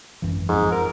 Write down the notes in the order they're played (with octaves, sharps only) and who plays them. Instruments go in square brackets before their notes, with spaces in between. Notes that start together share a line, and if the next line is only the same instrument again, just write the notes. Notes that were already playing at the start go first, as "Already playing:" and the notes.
[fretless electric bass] G#1 F#2 E3
[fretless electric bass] F2 F3 [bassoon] G#2
[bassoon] A#4